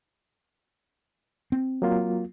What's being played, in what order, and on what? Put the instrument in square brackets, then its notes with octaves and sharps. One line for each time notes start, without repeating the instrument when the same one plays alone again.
[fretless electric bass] C4
[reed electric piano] F#3 A#3 F4